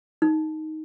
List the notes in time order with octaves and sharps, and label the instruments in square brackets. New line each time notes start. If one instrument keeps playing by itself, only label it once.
[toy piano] D#4